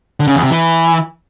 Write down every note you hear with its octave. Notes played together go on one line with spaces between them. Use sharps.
D3
C#3
E2
C3
E3